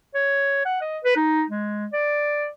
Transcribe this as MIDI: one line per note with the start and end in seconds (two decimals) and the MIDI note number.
0.14 0.61 73
0.65 0.78 78
0.81 0.98 75
1.04 1.15 71
1.16 1.44 63
1.49 1.86 56
1.93 2.48 74